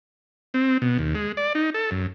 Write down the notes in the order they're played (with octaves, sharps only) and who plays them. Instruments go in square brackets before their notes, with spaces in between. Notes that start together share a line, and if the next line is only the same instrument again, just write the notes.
[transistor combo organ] C4
B2
D#2
G#3
D5
D#4
A4
F#2